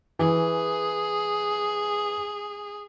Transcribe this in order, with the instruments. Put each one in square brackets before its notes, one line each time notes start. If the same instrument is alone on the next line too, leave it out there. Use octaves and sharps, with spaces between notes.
[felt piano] E3 [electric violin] G#4